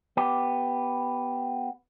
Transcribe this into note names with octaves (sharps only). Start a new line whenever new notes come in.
B3 G4